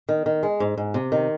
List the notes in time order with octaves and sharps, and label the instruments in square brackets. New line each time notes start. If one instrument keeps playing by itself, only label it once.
[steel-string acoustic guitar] D#3
D#3
G#3
G#2
G#2
C3
D#3